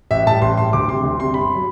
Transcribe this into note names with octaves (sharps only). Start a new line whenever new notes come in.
A1 E5
A2 G3 A5
A1 C6
A2 G3 C6
D2 D6
C3 G3 C6
D2
C3 G3 C6
G1 B5
F#3